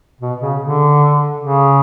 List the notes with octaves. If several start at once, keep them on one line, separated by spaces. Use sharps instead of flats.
B2
C#3
D3
C#3